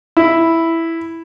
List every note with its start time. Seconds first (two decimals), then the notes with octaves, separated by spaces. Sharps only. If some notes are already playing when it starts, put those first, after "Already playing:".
0.17 E4